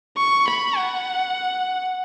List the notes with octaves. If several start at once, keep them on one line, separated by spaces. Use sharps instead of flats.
C#6
B5
F#5